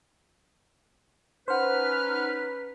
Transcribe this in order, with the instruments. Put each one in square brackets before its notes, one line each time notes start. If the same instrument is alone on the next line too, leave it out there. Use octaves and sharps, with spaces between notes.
[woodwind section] C#4 D#4 B4 [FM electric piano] C5 F#5 [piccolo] F6